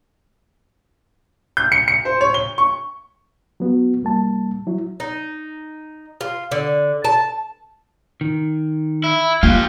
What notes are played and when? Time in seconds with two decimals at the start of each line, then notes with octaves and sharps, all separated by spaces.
1.57 G6
1.72 C#7
1.88 C#7
2.05 C5
2.21 C#5
2.34 G7
2.58 C#6
3.60 F#3 B3 F#4
4.02 C2 G3 A#3 A5
4.67 F#3 E4
5.00 D#4
6.21 F4
6.51 D3
7.04 A5
8.21 D#3
9.04 E4
9.43 A#3 F4 G4 F5